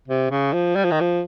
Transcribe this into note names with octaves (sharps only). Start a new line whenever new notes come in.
C3
C#3
F3
G3
F3
D#3
F3